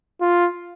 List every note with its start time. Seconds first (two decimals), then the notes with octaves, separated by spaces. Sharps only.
0.21 F4